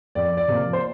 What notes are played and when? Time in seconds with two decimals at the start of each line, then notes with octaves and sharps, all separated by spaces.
0.15 F2 D5
0.37 D5
0.48 C3 F3 A#3
0.73 C5